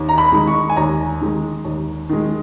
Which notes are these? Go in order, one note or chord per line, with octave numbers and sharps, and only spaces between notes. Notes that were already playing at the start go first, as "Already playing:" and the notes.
Already playing: D#2
A#5
B5
D#3 G#3
C#6
G#5
D#2 A#5
D#3 G#3
D#2
D#3 G#3